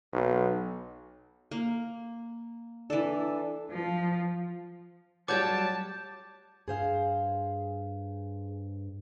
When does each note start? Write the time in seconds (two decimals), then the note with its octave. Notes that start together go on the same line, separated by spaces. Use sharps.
0.13 B1
1.51 A#3
2.90 E3 D4 A4
3.70 F3
5.28 F#3 G3 G4 A5 D6 G6 G#6
6.68 G2 G#4 C5 F5